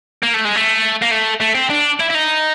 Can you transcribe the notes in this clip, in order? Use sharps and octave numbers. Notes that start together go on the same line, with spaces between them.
A#3
A3
G#3
A3
A#3
A3
A3
C4
D4
E4
E4
D#4